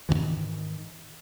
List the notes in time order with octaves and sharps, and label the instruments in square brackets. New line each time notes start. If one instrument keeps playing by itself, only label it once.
[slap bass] G#2 C3 D#3 E3